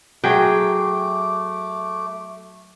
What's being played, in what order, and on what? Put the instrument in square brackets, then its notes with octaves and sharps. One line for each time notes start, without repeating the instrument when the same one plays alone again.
[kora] F#3 G#4 [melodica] A3 D6 [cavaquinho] G5